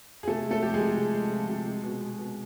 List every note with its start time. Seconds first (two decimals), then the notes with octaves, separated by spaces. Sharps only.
0.23 G#4
0.27 C3 A3 A4
0.45 G#3
0.51 A3 A4
0.62 F3 G4
0.74 G#3 G#4
0.80 C3
0.98 C3
1.15 G#3
1.32 F3
1.49 C3
1.67 G#3
1.84 B2
2.02 G#3
2.19 B2